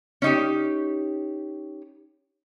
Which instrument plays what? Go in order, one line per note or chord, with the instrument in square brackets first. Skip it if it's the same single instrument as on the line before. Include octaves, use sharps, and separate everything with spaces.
[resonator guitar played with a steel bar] C#4 D#4 G4